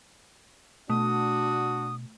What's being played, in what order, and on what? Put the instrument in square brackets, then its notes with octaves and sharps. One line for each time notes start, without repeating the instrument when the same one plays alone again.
[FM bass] B2 [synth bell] A3 [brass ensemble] D4 F#4 [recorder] D#6